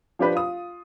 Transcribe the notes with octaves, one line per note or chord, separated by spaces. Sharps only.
F3 D4 G4 B4 C5
F4 D#6